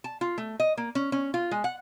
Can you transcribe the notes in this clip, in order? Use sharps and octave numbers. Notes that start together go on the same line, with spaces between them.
A5
F4
A3
D#5
A#3
C#4
C#4
F4
G#3
F#5